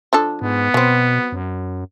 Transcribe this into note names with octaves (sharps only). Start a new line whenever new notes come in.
F3 D4 A4
G#2 B3
B2 F#3 C4
F#2